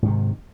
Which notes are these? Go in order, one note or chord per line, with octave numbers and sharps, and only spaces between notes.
G#2 C3 D#3